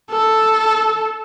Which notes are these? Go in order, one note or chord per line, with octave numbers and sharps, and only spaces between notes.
A4